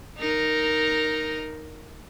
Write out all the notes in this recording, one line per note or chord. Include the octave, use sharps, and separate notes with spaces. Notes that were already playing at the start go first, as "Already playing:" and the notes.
D#4 A#4